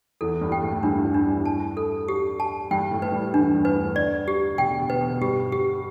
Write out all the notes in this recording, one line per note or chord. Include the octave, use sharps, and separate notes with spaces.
E2 E3 A4
G2 G3
G5
A2 A3
G2 G3 D4
E2 E3
D4
G2 G3
A5
A4
G4
A5
G2 G3 G5
A2 A3
B4
G2 G3
E2 E3 D4
G2 G3
B4
E2 E3
D2 D3 D5
G4
B2 G5
D3
B2
B4
B2
G2 G3 G4
G4